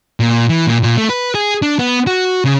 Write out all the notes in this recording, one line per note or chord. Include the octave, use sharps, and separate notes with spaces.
A#2
E3
A#2
A#2
A3
B4
G#4
D4
B3
F#4
C#3